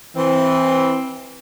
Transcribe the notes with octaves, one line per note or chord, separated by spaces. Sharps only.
E3 C4